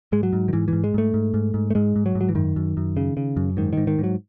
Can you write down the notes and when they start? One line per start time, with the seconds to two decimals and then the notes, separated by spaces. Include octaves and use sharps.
0.12 G#2 G#3
0.23 F#3
0.33 G#2
0.48 D#3
0.53 G#2 E3
0.68 G#2 E3
0.84 G#3
0.94 G#2 A3
1.14 G#2
1.34 G#2
1.54 G#2
1.70 A3
1.75 G#2 G#3
1.96 G#2
2.06 F#3
2.15 G#2
2.21 F#3
2.29 E3
2.35 F#2 D#3
2.56 F#2
2.77 F#2
2.97 C#3
3.17 C#3
3.37 F#2
3.57 G#2 D#3
3.73 G#2 D#3
3.87 D#3
3.99 G#2 F#3